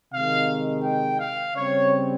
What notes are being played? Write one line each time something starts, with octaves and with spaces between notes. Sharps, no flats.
C3 D#3 G#3 F5
G5
F5
C#3 G3 C4 C#5